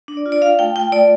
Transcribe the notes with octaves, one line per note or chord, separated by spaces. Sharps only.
D4
D5
F4
D5
F4 F5
A3 G5
F4 G5
A3 D5